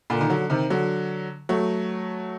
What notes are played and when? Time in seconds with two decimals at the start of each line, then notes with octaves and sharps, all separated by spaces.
0.10 A#2 D3
0.21 D#3
0.30 D3 F#3
0.50 C3 D#3
0.70 D3 F#3
1.49 F#3 A3